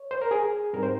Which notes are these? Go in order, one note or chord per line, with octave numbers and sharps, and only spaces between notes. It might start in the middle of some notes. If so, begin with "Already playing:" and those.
Already playing: C#5
C5
A#4
G#4
G#2 G3 C4 D#4 A#4
C5